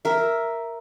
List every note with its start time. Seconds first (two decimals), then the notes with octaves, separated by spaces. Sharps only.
0.05 A#4 E5